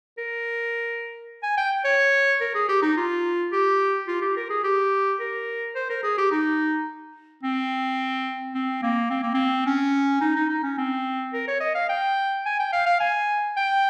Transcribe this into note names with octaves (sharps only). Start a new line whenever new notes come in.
A#4
G#5
G5
C#5
A#4
G#4
G4
D#4
F4
G4
F4
G4
A#4
G#4
G4
A#4
C5
A#4
G#4
G4
D#4
C4
C4
A#3
C4
A#3
C4
C#4
D#4
D#4
D#4
C#4
C4
A#4
C#5
D#5
F5
G5
G#5
G5
F5
F5
G#5
G5